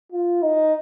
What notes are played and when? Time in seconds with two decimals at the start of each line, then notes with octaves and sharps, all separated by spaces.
0.12 F4
0.42 D#4